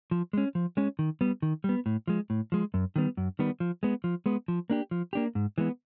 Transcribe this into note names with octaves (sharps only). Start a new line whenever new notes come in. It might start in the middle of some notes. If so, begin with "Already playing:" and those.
F3
G#3 C#4
F3
G#3 C#4
D#3
G3 B3
D#3
G3 B3
A2
F3 G#3
A2
F3 G#3
F#2
D#3 G3 B3
F#2
D#3 G3 B3
F3
G#3 B3
F3
G#3 B3
F3
A#3 D4 G4
F3
A#3 D4 G4
G#2
E3 G#3 B3